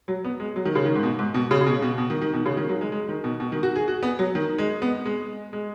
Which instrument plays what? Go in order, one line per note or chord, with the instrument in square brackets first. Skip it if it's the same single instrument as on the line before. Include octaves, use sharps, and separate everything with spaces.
[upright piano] F#3
B3
G#3
F#3
D#3
C#3
D#3
G#2
B2
G#2
B2
C#3
C#3
B2
B2
B2
D#3
D#3
B2
C#3
D#3
F#3
G#3
G#3
D#3
B2
B2
D#3
F#4
G#4
F#4
B3
F#3
D#3
G#3
B3
G#3
G#3